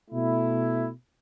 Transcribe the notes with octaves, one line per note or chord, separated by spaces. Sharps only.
B2 A3 E4